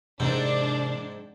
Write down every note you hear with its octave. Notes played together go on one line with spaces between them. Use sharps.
G#2 C3 E3 A#3 C4 D4